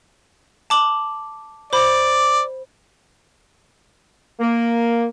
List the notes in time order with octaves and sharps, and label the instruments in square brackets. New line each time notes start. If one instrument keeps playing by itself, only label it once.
[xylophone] A5 D6 F#7
[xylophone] C5 B5 [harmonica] D5
[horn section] A#3